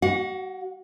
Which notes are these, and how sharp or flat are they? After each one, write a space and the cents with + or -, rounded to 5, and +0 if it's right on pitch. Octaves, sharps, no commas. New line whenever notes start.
F#4 +30 F#5 -35